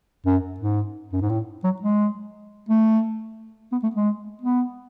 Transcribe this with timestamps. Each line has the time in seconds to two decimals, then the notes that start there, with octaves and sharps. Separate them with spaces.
0.26 F#2
0.60 G#2
1.13 F#2
1.21 G#2
1.29 A2
1.64 F#3
1.82 G#3
2.69 A3
3.72 B3
3.83 A3
3.95 G#3
4.42 B3